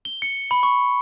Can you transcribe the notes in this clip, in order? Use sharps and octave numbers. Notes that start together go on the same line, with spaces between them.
G7
C#7
B5
C#6